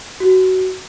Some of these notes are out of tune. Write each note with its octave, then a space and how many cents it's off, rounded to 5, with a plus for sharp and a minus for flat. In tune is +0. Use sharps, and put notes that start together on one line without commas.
F#4 +15